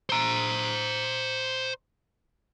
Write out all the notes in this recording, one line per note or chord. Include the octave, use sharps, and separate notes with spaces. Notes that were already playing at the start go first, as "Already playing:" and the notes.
C5 A#5